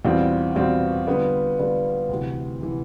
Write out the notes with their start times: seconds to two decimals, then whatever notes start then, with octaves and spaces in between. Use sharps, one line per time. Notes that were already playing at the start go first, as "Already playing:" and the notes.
0.05 E2 B2 G3 C4 F4
0.56 E2 B2 G3 C4 F4
1.07 D3 G3 B3 F4
1.58 D3 G3 B3 F4
2.09 D2 C3 E3
2.61 C3 E3